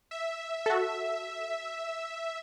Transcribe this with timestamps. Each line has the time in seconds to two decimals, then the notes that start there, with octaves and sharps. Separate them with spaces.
0.11 E5
0.66 F#4 A4